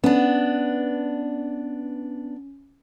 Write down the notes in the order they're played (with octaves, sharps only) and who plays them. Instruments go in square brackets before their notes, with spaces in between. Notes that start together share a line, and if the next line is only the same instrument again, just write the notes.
[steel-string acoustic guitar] B3 D4 [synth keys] C#4